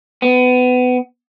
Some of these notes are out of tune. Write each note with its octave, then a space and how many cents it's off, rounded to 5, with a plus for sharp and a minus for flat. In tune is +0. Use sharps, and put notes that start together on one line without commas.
B3 +25